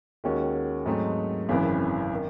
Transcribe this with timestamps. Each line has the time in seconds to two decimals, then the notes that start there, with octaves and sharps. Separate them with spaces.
0.24 D#2 D#3 G#3 C#4 F#4
0.86 G#2 F#3 A3 C4 D#4
1.49 G#1 F#2 C#3 E3 C4
2.15 D#3